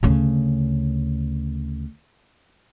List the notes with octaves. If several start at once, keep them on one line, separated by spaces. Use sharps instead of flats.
D2 C#3